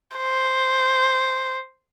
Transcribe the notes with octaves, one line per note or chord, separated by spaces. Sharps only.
C5